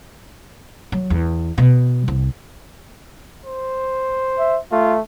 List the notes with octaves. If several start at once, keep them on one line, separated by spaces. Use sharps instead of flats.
F#3
E2
B2
C2
C5
E5
A3 F4